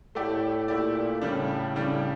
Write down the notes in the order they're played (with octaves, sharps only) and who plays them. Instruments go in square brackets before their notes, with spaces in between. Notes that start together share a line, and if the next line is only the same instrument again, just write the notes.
[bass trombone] A2 [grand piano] A3 E4 G4 D5
[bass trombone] A#2 [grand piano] A3 E4 G4 D5
[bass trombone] A2 [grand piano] C#3 G3 D4
[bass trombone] A2 [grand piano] C#3 G3 D4